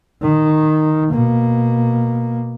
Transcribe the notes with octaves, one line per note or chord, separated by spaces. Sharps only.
D#3
B2 A#3